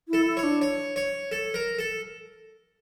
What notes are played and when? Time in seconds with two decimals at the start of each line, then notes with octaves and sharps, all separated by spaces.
0.08 E4
0.13 A4
0.26 E4
0.37 C#5
0.43 D4
0.61 C#5
0.96 C#5
1.32 A4
1.54 A#4
1.79 A4